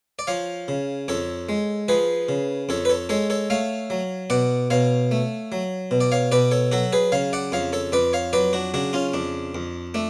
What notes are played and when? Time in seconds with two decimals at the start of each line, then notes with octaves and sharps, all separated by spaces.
0.19 D5
0.27 F3 C#5 F5
0.68 C#3
1.08 F2 A4 C#5
1.49 G#3
1.88 F3 G#4 B4
2.29 C#3
2.69 F2 A4 C#5
2.85 B4
2.89 A4 C#5
3.09 G#3 A4 C#5
3.30 A4 C#5
3.50 A3 C#5 F5
3.90 F#3
4.30 B2 D5 F#5
4.70 B2 C#5 F5
5.11 A3
5.52 F#3
5.91 B2
6.00 D5
6.12 C#5 F5
6.32 B2 B4 D5
6.51 A4 C#5
6.72 F#3 F#4 A4
6.93 G#4 B4
7.12 C#3 C#5 F5
7.33 D5 F#5
7.52 F2 C#5 F5
7.73 A4 C#5
7.92 F2 B4 D5
8.13 C#5 F5
8.33 F#3 B4 D5
8.53 D4 F#4
8.74 C#3 D4 F#4
8.93 C#4 F4
9.14 F2 D4
9.55 F2
9.94 A3 D4